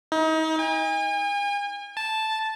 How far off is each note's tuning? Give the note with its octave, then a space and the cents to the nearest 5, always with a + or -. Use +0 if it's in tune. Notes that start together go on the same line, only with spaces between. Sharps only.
D#4 +35
G#5 -40
A5 -5